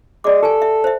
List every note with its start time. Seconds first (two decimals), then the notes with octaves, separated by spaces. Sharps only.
0.24 G#3 D5 D6
0.42 G4 A4 A#4 G#5
0.62 E5
0.84 C5 E5